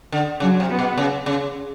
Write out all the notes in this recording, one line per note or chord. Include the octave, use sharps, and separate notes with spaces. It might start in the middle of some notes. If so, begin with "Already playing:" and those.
D3
C#3 F#3
C3
B3
B2
C#3
C#3